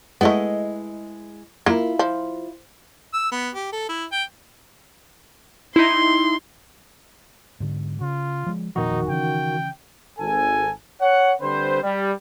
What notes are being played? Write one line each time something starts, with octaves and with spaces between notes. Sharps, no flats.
G#3 A3 B3 E4 D#5
A#3 E4 F4 A#4
F3
E6
B3
G4
A4
E4
G5
D#4 E4 C6
G#2 D3
C#3 F4
F3 G#3
E1 A#2 D#3 F3 D#4 F#4
C#3 E3 C#4 G5
G#1 A4 G#5
C#5 F#5
D3 G3 C4 B4 C5
G3